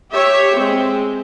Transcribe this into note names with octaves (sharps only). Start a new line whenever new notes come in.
G4 C#5 E5
G#3 C4